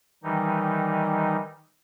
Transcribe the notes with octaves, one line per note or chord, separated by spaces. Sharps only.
D#3 E3 G3 D#4